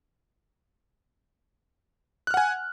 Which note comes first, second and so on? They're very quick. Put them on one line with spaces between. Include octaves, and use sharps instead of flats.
F#6 F6 F#5 G#5